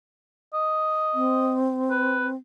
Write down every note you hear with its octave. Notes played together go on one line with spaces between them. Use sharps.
D#5
C4
B4